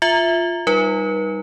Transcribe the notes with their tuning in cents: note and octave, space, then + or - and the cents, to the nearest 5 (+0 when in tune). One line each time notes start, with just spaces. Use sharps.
F4 +0 E5 +0
G3 +0 D#4 +0 B4 -45